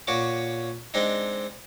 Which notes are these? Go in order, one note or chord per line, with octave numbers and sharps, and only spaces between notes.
A#2 C#4 F#4 D6
G#3 C4 D4 D#4